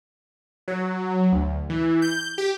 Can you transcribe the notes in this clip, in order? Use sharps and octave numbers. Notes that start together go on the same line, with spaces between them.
F#3
D2
E3
G6
G4